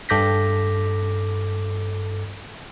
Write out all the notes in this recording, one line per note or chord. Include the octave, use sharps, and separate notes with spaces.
G2 A4 D6 G6 A#6 B6